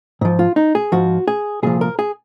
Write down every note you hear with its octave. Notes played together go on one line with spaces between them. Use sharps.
G#2 F3
F4
D#4
G#4
G#2 F3 F#4
G#4
C2 A#2 F3 G#4
A#4
G#4